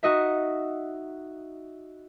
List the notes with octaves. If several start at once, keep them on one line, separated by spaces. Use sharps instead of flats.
D#4 F#4 D#5 E5